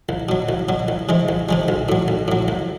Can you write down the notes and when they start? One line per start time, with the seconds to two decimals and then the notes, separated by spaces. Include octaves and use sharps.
0.09 C2
0.29 B2 F#3
0.49 C2
0.69 B2 F#3
0.88 C2
1.09 C3 E3 G#3
1.29 C2
1.49 C3 E3 G#3
1.68 B1
1.89 A2 F#3
2.08 B1
2.28 A2 F#3
2.48 C2